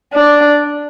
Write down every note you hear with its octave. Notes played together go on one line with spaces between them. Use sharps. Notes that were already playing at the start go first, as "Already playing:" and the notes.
D4